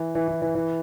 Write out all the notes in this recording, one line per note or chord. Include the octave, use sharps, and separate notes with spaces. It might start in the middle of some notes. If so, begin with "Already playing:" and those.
Already playing: E3
E3
E3
E3
E3